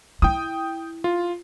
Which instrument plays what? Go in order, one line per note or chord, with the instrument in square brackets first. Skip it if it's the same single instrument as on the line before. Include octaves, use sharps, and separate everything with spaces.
[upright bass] E4 [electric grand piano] G5 D#6
[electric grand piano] F4